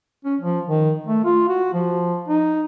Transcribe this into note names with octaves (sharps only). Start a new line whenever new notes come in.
C#4
F3
D#3
A3
F4
F#4
F3
D#4